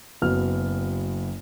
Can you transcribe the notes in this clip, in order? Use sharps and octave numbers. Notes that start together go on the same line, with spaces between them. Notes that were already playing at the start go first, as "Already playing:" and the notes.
F#1 F#3 B3 F6